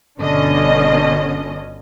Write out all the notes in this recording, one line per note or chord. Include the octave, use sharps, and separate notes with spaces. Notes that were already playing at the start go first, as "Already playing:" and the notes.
G1 B2 D3 C#4 D4 D#5